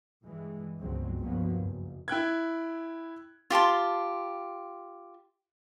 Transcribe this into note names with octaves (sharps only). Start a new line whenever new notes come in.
G2 E3 G#3
G1 C#2 D3 F#3 G#3 C4
F#1 G2 F3 F#3 A#3 B3
F#1
E4 G5 F#6 G#6
F4 G4 A5 C6